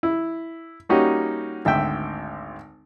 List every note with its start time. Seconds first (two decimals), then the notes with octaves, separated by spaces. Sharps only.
0.03 E4
0.89 G3 A#3 C#4 D#4 F#4 G4
1.65 G#1 D2 E5 G5